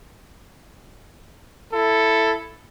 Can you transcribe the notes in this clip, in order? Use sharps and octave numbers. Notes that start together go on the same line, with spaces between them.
E4 A4